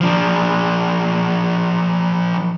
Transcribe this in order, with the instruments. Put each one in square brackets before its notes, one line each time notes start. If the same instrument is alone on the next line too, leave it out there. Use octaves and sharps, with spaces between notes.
[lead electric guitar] F3 D4